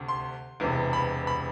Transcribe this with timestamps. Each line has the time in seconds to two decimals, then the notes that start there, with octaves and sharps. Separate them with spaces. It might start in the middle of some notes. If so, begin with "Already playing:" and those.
Already playing: D2 C3
0.08 C6
0.60 E1 E2 C3
0.93 B5
1.27 B5